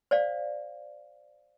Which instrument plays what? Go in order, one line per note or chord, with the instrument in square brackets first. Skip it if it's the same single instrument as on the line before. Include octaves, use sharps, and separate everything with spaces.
[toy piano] C5 D5 F5